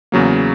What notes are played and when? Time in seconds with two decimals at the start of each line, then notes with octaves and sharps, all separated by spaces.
0.12 E2 C#3 F#3 A#3